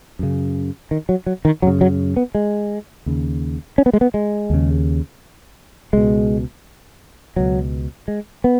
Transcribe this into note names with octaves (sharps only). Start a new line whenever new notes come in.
F#2 C#3
D#3
F#3
F#3
D#3
F#2 C#3 F#3
F#3
B3
G#3
D#2 C#3
C#4
B3
G#3
B3
G#3
D#2 C#3
C#2 B2 G#3
C#2 B2 F#3
G#3
B3